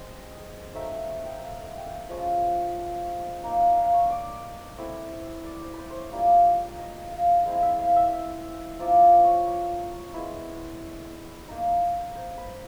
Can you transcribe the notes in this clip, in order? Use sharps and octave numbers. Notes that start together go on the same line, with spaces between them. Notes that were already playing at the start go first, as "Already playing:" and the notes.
Already playing: G#3 C4 D#5
F#3 A3 C4 D#4 E5
F#5
G5
F#5
F#5
G5
F#5
F3 G#3 C#4 F4
A#3 D#4
F#5
F5
C#5
D5
A3 C4 E4
D5
C5
B4 C5
C5 C#5
G3 A#3 D4 F4
D#5
F5
F#5
G#3 C4 E4 F5
E5
F5
E5
F3 A#3 D4 F4 D5
D5
C#5
C#5
G#3 B3 E4
A#3 D#4
C5
B4